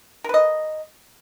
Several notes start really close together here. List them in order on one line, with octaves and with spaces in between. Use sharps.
A#4 B4 D#5